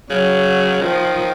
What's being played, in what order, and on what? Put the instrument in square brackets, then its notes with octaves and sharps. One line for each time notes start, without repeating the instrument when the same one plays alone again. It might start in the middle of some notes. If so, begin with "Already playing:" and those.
[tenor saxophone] C#3 [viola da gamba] F#3
[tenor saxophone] D#3 [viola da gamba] F3